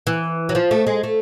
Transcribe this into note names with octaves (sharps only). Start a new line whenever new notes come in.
E3
F#3
F3
A3
G#3
A3